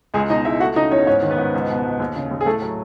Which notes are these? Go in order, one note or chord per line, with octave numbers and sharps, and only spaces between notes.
C#2 G#3 G#4
B2 D#4 D#5
C#2 E4 E5
A3 F#4 F#5
C#3 D#4 D#5
E2 C#4 C#5
G#2 C#4 C#5
D#3
B3 B4
G#2
C#2
B2
C#2
D#2
C#3
D#2
G#4
A2 A3 A4
F#3